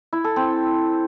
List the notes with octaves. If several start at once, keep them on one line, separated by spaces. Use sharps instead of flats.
E4
A4
C4